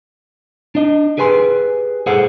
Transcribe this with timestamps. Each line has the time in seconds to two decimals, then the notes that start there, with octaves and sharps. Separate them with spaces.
0.75 D4 D#5
1.18 G4 G#4 B4 G#5 C6
2.06 G#4 A4 C5 F#5